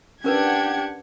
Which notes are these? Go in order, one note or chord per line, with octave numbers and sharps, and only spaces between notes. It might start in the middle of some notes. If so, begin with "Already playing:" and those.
C#4 D4 G4 A#4 B4 F#5 G5 G#6